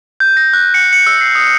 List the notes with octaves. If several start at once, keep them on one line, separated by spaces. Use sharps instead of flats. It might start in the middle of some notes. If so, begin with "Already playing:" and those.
G6
A#6
F#6
C#7
C#7
E6
C7
D#6